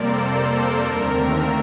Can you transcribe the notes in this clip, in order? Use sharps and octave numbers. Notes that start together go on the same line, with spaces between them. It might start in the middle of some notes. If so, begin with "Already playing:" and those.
Already playing: F2 C3 G3 A#3 A4 A#4 C5 D5
A4
D#2 D3 A3 C4 A#4